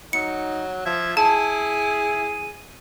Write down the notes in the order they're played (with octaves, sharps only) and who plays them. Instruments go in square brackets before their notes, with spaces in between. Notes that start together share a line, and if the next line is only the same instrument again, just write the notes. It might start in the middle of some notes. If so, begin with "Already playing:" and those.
[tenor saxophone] F#3 [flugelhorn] D#4 [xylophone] C#7
[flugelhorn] F3 [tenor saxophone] E5 [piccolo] G#6
[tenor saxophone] E4 [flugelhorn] G#4 [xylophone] A5 [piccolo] D#7